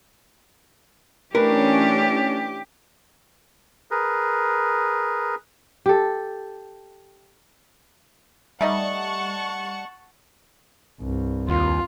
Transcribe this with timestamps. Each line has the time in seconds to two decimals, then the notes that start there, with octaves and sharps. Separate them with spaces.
1.35 E3 A3 C#4 D4 G4 A#4 B4
3.91 G#4 A#4 B4
5.86 G4 A4
8.61 G3 A3 D#4 D#5 F#5 A5 C#6
11.01 C2 G2
11.49 D#2 F4